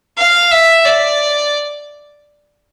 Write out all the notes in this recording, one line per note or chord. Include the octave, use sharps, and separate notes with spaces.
F5
E5
D5